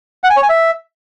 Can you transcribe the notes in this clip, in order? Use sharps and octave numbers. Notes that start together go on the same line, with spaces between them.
F#5
G#5
C#5
G#5
E5